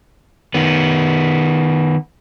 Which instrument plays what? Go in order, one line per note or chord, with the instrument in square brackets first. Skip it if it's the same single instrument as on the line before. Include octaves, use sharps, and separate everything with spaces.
[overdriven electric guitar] D#3 B3